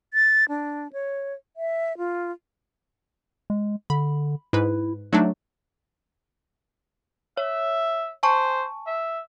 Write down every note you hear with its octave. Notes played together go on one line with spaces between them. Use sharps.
A6
D4
C#5
E5
F4
G#3
D3 B5
G#2 E4 B4
F#3 A3 D4 D#4
C#5 E5
C5 G#5 A5 C#6
E5